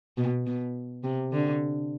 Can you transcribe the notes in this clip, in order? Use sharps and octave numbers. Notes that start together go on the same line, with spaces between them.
B2
B2
C3
D3